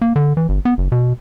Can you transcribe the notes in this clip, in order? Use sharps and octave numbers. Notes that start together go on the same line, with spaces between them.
A#3
D3
E3
G1
B3
F#1
B2